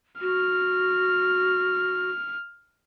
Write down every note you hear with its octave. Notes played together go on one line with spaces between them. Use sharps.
F#4 F6